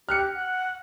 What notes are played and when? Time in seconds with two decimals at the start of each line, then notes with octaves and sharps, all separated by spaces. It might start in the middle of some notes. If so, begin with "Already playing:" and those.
0.09 G4 F6 F#6 C#7
0.35 F#5